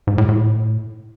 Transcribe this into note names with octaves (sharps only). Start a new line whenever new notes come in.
G#2
A2
A2